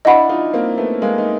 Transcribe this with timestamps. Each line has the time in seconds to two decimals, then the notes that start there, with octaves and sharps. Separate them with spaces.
0.05 D4 E4 D#5 F#5 B5
0.29 D#4 F4
0.53 A#3 C4
0.78 A3 B3
1.02 G#3 A#3
1.18 D#4